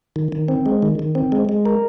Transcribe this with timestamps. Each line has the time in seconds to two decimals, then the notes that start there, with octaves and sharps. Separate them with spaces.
0.16 D#3
0.32 D#3
0.48 C4
0.66 G#3
0.82 D#3
0.99 D#3
1.15 C4
1.32 G#3
1.49 G#3
1.66 A#4